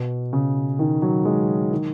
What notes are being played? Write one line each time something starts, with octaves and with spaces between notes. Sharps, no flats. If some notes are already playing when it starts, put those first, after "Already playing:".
Already playing: B2
C#3
D#3
F#3
G#3
D#3